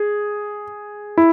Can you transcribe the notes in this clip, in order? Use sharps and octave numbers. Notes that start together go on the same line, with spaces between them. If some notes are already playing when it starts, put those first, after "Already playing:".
Already playing: G#4
E4